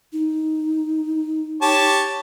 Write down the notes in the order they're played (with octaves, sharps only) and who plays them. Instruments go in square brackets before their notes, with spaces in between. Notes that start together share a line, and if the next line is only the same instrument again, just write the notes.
[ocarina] D#4
[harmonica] G4 C#5 A5